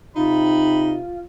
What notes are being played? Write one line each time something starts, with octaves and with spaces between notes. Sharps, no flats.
C3 D#4 F4 B5